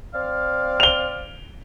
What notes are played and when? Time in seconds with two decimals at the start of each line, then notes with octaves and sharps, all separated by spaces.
0.15 C4 D5 F5
0.80 F7 G7